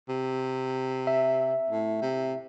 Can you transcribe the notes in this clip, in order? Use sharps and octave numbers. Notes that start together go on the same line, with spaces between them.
C3
E5
A2
C3